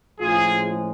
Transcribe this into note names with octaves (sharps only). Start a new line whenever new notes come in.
A2 F3 G#3 C#4 F4 G#4